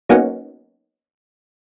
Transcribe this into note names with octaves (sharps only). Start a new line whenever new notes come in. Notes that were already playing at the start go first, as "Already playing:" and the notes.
F#3 A#3 B3 C#4 D#4 F#4